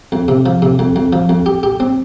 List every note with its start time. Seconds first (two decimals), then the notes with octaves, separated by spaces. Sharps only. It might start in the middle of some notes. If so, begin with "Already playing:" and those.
0.12 F2
0.28 C3
0.46 F3
0.62 C3
0.79 F2
0.96 F2
1.13 F3
1.29 F2
1.46 G4
1.63 G4
1.80 C4